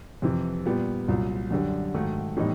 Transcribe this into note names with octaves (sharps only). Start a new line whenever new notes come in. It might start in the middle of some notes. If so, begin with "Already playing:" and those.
F2 C3 E3
A#2 G3 B3
C2 A#2 F#3
F#2 D3 G3
G#2 D#3 F#3 A3
A2 E3 G3 B3 D#4